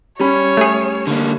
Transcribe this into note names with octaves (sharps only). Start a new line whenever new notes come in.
G3 C#4 C#5 B5
A3 G#4
D3 A#3